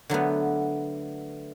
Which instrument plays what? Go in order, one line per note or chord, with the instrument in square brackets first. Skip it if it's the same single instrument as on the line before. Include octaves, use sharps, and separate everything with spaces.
[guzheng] D3 F#3 A3 B3